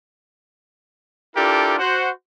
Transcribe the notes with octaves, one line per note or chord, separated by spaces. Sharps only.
D4 E4 F4 G4 A4 A#4
F#4 C5 F#5